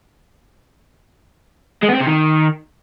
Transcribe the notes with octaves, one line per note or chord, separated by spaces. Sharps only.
G#3
B3
C4
C3
D#3